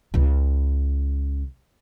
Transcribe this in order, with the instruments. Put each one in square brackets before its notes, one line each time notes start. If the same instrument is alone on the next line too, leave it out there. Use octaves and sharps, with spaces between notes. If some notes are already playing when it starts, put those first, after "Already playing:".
[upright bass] C#2 C#3